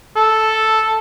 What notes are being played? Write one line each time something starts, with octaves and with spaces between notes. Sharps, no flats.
A4